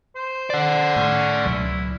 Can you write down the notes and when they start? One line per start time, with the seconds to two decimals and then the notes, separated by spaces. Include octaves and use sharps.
0.16 C5
0.50 D5 F#5
0.96 A2 C#4
1.45 C#2 B2 F#3 E4